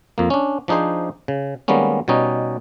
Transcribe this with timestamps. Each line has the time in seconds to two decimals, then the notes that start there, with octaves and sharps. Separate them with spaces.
0.18 F2 A#3
0.30 C#4 D4
0.68 F3 D4 D#4 G#4 C5
1.28 C#3
1.68 D#3 G3 G#3 A#3 B3 C#4
2.08 B2 G3 C#4 D#4